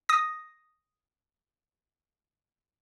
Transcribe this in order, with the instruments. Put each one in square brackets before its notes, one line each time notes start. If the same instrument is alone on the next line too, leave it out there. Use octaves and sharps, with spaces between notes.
[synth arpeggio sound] D#6 A#6